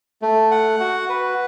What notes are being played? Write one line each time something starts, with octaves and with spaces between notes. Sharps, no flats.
A3
F#5
F#4
B4